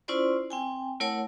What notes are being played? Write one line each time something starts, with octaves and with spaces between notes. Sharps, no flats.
C#4 E4 F4 C5 D5 C6
C4 G5 G#5
A3 E4 A#4 C#5 F#5 A5